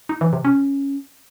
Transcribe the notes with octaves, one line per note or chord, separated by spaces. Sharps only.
D#4
E3
C3
C#4